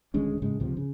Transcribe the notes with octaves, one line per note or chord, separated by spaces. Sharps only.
D#1 D2 G#3 C#4
A2 C#3 G#3
C#2 C3 F3
C#3